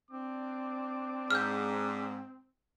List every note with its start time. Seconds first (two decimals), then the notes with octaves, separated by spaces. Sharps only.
0.11 C4 D4 D6
1.31 G#2 F6 G6